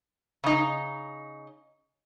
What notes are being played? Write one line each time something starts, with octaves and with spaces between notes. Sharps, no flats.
C#3 D#4